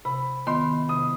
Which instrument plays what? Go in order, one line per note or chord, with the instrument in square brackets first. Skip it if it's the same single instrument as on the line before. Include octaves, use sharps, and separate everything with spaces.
[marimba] C3 [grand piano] B5
[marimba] D#3 B3 F4 [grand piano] C6
[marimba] C3 [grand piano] D#6